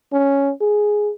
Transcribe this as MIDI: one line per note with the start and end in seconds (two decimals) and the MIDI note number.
0.13 0.52 61
0.61 1.12 68